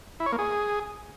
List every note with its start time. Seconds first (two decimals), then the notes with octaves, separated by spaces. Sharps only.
0.20 E4
0.26 C#5
0.32 A#3
0.39 G#4